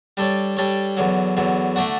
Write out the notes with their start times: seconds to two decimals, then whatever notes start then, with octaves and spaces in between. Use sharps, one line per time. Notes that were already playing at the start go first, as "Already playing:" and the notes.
0.17 G3 D4 A4 C#5
0.57 G3 D4 A4 C#5
0.97 E2 D3 F#3
1.37 E2 D3 F#3
1.76 D3 A3 D4 F#4